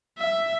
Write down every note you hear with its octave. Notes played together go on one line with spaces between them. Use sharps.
E5